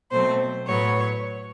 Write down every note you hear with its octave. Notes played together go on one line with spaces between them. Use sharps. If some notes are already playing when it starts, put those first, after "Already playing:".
B2 F#3 A3 C4 C5
A2 F#3 B3 C#5